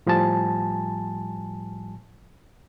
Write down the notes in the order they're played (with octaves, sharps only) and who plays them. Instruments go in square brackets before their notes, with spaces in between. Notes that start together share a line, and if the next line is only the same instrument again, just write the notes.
[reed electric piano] A2 F3 G3 G#5 A5